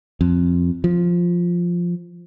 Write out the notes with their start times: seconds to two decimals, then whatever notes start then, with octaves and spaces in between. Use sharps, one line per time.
0.21 F2
0.84 F3